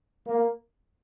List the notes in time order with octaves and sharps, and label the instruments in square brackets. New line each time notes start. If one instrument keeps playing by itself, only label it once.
[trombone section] A#3